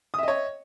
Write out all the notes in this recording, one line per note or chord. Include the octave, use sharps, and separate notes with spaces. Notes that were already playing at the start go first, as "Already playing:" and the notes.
C#5 D#5 E5 D#6